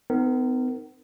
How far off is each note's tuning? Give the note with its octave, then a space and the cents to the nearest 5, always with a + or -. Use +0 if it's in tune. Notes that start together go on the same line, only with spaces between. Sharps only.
B3 +40 D#4 +0 A#4 -15